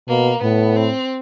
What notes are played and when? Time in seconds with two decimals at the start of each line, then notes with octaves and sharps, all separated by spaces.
0.08 B2 A#3
0.42 A2 B3
0.76 C4